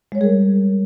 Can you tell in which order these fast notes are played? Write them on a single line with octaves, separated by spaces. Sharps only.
G#3 C#5 G3 G#4 A#4